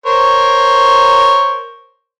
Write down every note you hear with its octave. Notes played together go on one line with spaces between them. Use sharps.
A#4 C5 C#5